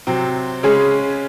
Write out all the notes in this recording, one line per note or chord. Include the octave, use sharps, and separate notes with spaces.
C3 F#3 C4
C#3 G#3 C#4 G#4